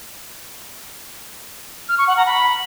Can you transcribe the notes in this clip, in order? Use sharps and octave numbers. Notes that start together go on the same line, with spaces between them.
F6
C#6
F#5
A#5
B5